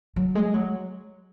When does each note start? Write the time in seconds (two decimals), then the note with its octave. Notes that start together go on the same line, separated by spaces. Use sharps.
0.16 F#3
0.35 G#3
0.54 F#3